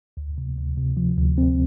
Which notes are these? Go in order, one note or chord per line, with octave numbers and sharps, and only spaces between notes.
D2
C3
D2
C3
F3
D2
C4